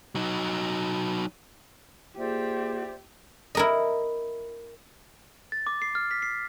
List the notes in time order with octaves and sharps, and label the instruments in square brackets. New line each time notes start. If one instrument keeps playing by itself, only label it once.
[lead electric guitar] F#3 D#4
[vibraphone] A#3 F4 G#4 [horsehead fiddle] G4 [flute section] C5 D5 E5
[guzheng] E4 A#4 D#5
[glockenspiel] A6
D6
C7
F6
B6
C7